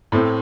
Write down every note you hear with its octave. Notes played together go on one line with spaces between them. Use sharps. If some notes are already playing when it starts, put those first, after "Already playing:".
A2 A3 C4